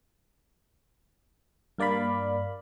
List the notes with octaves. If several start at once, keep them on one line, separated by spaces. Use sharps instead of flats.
G2 A#3 D5 F5 B5